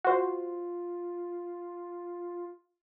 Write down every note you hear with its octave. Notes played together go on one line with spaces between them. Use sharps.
F4 F#4 C5